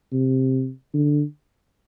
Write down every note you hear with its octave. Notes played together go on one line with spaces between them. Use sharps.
C3
D3